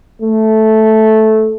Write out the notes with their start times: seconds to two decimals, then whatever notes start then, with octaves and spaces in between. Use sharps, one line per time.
0.22 A3